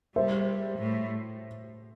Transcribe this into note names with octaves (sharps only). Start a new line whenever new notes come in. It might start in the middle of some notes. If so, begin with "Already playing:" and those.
G3 C5 E5
A2